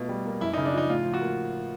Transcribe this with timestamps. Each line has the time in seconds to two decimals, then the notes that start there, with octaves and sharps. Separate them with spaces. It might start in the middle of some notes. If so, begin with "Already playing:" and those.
Already playing: B2 A3 F4
0.09 G3
0.25 A#3
0.41 F#2 E4
0.53 C#3 D#4
0.65 D4
0.73 F3 D#4
0.89 A2 F4
1.05 F3
1.14 F#4
1.21 A#3